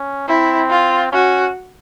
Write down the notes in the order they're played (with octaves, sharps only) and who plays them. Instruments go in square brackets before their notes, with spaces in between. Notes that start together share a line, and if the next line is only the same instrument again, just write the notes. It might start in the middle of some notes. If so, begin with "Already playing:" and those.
Already playing: [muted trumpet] C#4
[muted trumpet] C4 [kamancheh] E4
[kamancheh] F4
[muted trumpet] C#4 [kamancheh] F#4